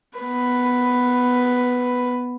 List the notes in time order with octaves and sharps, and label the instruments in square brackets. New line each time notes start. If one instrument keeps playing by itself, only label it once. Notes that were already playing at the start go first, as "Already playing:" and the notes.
[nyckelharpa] B3 B4